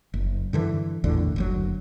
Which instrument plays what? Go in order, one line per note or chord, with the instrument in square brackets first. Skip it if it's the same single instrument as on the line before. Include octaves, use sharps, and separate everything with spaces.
[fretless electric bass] F#1
G2 D3 E3
A#1 E2 A2 D3
F#1 D2 F#3